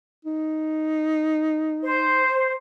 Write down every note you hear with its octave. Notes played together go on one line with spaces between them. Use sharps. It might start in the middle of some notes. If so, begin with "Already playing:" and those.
D#4
C5